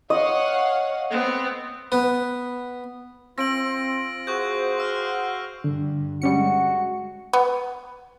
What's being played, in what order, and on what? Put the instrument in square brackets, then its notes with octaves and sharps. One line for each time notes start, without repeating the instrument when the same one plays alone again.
[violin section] C#5 F5 F#5 [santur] D#5
[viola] B3 C4
[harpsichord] B3
[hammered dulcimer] C4 [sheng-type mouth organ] F4 [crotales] A#6 D7 F#7
[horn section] F#4 G#4 C5 [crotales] C#6 F#6 G6
[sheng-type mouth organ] F5 C6 [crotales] C#6 E6 F6
[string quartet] G2 [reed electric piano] D3
[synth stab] G3 C#4 C#7 [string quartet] G#3 [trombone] F#4
[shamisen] B3